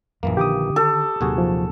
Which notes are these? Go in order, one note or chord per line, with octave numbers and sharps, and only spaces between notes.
A#1 F#2 E3 A#3
D3 D#3 G4 D6 D#6
A4 A5
D#1 D#2 C3 F#3 F#4 G#4
F3